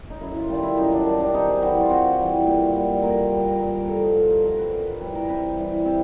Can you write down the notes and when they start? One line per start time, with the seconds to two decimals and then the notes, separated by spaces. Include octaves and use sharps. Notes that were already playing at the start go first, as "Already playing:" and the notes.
0.10 D#4
0.21 F#2 E4
0.36 F4
0.49 D#3 G3 F4
0.63 E4
0.77 F#2 D#4
0.92 D4
1.06 D#3 G3
1.20 D4
1.34 C3 D#4
1.48 G#4
1.62 E3 G3 F#4
1.81 F4
1.90 C3 F#4
2.18 E3 G3
2.46 A#2
2.75 G3
3.03 A#2 A#4
3.31 G3
3.60 G2 A#4
3.74 A#4
3.87 D3 F3 A4
4.02 D#4
4.16 G2 F4
4.30 A#4
4.44 D3 F3 A#4
4.58 B4
4.72 C3 A#4
4.87 B4
5.01 E3 G3 B4
5.15 A#4
5.29 C3 B4
5.56 E3 G3
5.85 C3